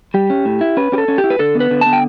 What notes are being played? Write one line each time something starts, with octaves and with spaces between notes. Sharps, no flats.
G3 G4
C#4
A2
E4
C#4 B4
C#4 G4
A4
C#4
G4
E4
B4
D3 A4
B3
B4
D3
B3 A5
G5